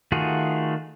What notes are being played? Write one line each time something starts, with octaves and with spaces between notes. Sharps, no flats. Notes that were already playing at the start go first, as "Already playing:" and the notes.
D#3 A3 F4 F#4 G#4